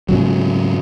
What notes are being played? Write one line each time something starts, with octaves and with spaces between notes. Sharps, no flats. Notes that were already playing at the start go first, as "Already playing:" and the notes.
G#2 C#3 F#3